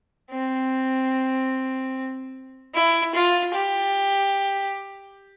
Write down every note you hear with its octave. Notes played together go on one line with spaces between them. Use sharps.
C4
E4
F4
G4